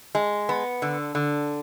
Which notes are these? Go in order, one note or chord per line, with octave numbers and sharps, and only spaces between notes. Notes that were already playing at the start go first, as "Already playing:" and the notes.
G#3
B3
D3
D3